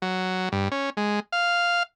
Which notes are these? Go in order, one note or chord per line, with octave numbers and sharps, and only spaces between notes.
F#3
G2
C#4
G#3
F5